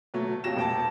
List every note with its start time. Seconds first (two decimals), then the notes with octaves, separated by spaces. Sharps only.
0.14 B2 F#3 A3
0.44 F2 F#3 A#3 G4 A#6 E7
0.56 E1 G5 A5